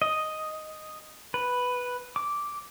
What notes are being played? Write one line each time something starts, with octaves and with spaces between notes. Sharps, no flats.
D#5
B4
D6